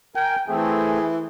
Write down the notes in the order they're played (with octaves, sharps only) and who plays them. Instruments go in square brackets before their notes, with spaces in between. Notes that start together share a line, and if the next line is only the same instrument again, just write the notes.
[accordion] A#4 G#5 [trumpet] G5
[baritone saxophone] E3 [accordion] A3 C4 [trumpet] G#4